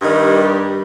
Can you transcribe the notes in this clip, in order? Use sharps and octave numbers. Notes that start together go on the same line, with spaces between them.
G2 D#3 G3